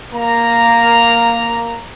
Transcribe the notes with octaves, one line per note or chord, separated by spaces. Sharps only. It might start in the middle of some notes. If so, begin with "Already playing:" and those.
A#3 A#5